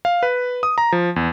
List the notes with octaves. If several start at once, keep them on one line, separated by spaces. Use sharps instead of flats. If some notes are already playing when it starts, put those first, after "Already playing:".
F5
B4
D#6
A#5
F3
E2